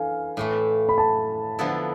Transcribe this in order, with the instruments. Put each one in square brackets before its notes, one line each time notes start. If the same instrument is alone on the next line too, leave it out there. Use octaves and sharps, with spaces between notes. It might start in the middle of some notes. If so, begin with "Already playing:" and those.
Already playing: [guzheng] E3 D4 A4 [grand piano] F5 G#5
[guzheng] A2 E3 A3
[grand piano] B5
A5
[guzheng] D3 F3 B3 E4 A4